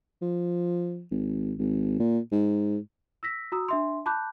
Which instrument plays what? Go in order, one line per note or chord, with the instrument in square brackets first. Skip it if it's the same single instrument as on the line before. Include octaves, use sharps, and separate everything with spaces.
[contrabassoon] F3
G#1
G#1
A#2
G#2
[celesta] E6 A#6 B6
F#4 A#5 D#6 E6
D4 E5 C6
A5 B5 D6 F#6 G6